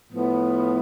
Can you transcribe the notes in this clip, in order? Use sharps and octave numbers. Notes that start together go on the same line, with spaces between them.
A2 F3 B3